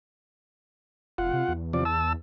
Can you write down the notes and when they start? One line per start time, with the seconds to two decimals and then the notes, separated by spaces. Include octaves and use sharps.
1.18 F1 F4 F#5
1.33 C3
1.48 E2
1.73 C3 F3 D5
1.85 A5 E6